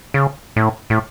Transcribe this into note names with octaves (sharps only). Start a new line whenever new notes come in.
C#3
A2
A2